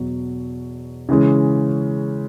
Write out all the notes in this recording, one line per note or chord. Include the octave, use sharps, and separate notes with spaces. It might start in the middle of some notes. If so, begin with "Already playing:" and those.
Already playing: E2 B2 F#3
C#3 E3 G#3 C#4